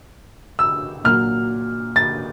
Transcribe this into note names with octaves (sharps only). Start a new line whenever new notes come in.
E6
A#2 F#3 F6
A6